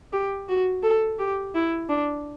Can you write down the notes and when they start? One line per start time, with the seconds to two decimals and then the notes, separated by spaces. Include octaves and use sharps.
0.13 G4
0.49 F#4
0.83 A4
1.19 G4
1.55 E4
1.89 D4